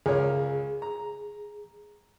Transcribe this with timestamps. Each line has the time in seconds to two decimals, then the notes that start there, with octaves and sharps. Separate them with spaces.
0.06 C#2 G#4 A#4 C#5
0.82 A#5